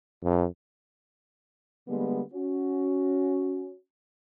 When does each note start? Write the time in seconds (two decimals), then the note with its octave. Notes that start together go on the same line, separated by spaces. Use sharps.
0.24 F2
1.88 D3 G3 G#3 A#3 B3
2.34 C#4 F#4